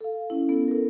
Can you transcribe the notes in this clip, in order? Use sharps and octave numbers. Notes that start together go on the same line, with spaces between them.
A4 F5
C#4 E4
B3 A4
A4 A#4